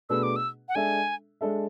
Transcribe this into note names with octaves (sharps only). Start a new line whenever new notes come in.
B2 A3 D4 G#4 B4 E6
D6
E6
F#5
G#3 D4 A4 E5 G#5
G#3 D4 A4 E5